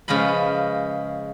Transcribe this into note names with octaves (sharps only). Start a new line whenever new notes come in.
C#3 F3 G#3 B4 B5